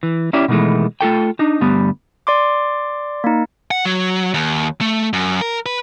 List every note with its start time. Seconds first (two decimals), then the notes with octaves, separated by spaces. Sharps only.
0.03 E3
0.33 C#4 E4 G4 D5
0.48 B2 D#3 E3 G#3 A3
1.01 A3 F4 A4 G5
1.39 D4 D#4
1.61 D2 G2 G3 B3
2.27 D5 C6 D6
3.24 A#3 D#4
3.71 F#5
3.85 F#3
4.34 D#2
4.81 A3
5.13 F#2
5.41 A#4
5.66 B4